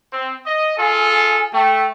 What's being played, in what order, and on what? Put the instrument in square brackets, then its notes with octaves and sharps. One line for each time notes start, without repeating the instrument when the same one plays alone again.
[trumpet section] C4
D#5
[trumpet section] F4 G#4 A4 [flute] G#5
[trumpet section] A3 [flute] G5